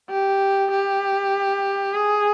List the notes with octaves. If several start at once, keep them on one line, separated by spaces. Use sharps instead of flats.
G4
G4
G#4